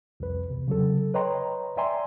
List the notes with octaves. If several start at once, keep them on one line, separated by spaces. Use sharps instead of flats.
C2 F2 B4
E2 C3
C#3 F#3 A4
B4 C#5 D#5 G5 A#5 C6
D5 E5 G5 G#5 A#5 C6